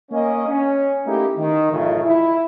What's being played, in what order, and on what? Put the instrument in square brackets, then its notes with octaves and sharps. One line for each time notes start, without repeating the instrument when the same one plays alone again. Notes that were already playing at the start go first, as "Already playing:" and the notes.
[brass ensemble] A#3 C#4 D#5
C#4
A3 A#3 D#4 E4 G4
D#3
A1 F#2 C#3 A3 D#4 F4
E4